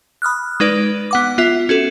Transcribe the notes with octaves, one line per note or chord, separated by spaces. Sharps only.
B5 D#6 F6 F#6
G#3 D#4 B4 D5 D7
B3 F#5 D6
B3 F4 E5
C#4 F#4 A4